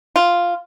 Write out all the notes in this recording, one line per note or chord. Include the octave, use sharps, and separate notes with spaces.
F4